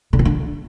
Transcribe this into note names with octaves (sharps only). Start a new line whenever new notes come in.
D3
C#4
D4